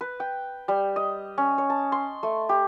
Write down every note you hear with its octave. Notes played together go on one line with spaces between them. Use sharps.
B4
G5
G3
D#5
C#4
C#5
A5
C6
A3
G4